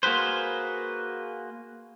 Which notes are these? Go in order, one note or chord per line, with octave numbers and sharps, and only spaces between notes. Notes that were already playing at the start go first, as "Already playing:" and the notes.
A#3 F#4 G#4 B4 C5